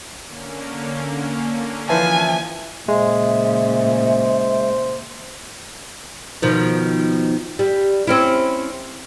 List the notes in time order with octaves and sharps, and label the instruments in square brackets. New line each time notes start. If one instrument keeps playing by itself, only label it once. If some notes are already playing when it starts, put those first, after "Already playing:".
[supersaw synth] D3 A#3 C#4
[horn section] E3 F3 [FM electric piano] B4 E5 A5 [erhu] G#5
[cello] A#2 C#3 [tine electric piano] G#3 [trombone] C5 [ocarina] E5
[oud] B2 D#3 F3
G3
C4 C#4 E4